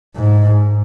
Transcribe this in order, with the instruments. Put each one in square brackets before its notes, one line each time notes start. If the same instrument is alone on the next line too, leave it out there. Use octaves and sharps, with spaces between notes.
[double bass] G#2